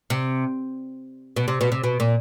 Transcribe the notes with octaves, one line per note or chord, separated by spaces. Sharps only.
C3
B2
C3
B2
C3
B2
A#2